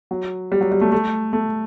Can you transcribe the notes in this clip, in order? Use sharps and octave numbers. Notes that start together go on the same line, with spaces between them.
F#3
G3
F#3
G3
A3
A3
A3